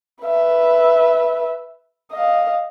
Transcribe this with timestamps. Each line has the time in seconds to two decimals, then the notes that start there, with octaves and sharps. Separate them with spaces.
0.24 B4 E5
2.12 D#5 F5